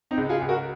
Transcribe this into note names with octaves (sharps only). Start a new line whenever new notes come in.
C4 D#4
C#2
F4 G#4
C#2
F#4 A#4